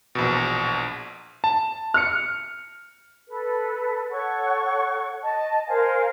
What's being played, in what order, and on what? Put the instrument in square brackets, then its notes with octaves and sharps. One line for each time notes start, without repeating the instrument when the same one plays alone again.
[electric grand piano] A#1 E2 B2
A5
[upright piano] F6 C#7
[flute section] A4 B4
A4 C#5 F#5 C#6
D#5 A5
A#4 C5 F5 G#5